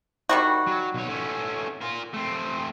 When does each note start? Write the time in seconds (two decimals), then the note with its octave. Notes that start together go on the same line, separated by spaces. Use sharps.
0.29 D#3 G3 F#4
0.67 F#3
0.94 B1 C#5
1.08 A3 C#4
1.82 F4 A#4
2.14 A3 C4